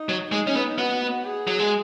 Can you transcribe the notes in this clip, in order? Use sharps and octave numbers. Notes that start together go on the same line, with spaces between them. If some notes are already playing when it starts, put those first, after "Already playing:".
Already playing: D#4
F#3
G#3 D#4
C#4
B3
B3 F#4
G#4
F#3
G#3